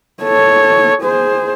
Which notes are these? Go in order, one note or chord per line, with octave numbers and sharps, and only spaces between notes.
A4 C#5
G#4 C5